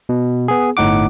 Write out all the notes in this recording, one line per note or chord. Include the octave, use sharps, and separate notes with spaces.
B2
B3 G#4
G1 A2 D#4 F#5 D6